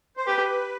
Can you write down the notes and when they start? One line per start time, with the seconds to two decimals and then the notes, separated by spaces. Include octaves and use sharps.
0.17 C5
0.26 G4 B4